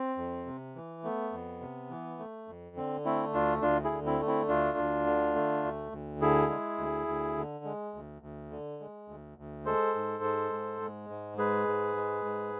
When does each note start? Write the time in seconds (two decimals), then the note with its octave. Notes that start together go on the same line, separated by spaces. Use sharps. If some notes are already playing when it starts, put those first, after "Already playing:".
Already playing: C4
0.17 F2
0.46 C3
0.76 E3
1.03 A3 B3
1.32 F2
1.61 C3
1.90 E3
2.19 A3
2.48 F2
2.76 D3 C4
3.05 A3 C4 E4
3.33 D2 D4 F4
3.62 D2 D4 F4
3.84 E4 G#4
3.92 D3
4.06 C4 E4
4.21 A3
4.27 C4 E4
4.48 D2 D4 F4
4.78 D2
5.06 D3
5.35 A3
5.64 D2
5.92 D2
6.21 D3 E4 G#4
6.50 G#3
6.78 D2
7.08 D2
7.37 D3
7.65 G#3
7.94 D2
8.22 D2
8.51 D3
8.80 G#3
9.08 D2
9.38 D2
9.66 G#3 A4 C5
9.95 G#2
10.24 G#3
10.53 G#2
10.81 G#3
11.10 G#2
11.38 G#3 G#4 B4
11.68 G#2
11.97 G#3
12.25 G#2